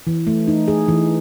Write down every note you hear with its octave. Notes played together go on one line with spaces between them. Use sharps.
E3
A3
D#4
G#4
E3